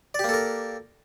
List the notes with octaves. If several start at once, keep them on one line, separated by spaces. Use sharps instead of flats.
A#3 G4 A4 A#4 D5